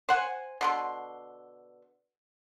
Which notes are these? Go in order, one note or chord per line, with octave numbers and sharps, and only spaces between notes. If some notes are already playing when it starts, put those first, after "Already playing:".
C5 F#5 G#5
B2 D3 C6